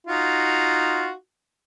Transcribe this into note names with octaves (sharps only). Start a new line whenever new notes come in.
D#4 F4 F#4